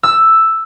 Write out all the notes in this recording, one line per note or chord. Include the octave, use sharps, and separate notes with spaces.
E6